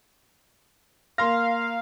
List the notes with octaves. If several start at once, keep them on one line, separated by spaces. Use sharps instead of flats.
A#3 F5 C6 A#6